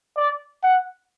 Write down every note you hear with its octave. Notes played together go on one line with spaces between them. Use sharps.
D5
F#5